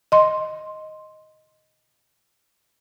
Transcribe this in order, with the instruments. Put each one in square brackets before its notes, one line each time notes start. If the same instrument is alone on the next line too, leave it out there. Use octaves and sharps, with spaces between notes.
[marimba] D#5 C6